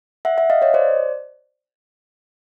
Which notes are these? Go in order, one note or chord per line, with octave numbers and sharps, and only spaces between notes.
E5 F#5
E5 F#5
D#5 F5
C#5 D#5
C5 D5